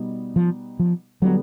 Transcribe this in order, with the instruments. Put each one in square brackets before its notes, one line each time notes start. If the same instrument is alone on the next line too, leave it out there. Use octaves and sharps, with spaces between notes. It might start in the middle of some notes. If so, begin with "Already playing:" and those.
Already playing: [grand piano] B2 G3 B3 D#4
[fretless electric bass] F3
F3
[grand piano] D3 G3 B3 [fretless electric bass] F#3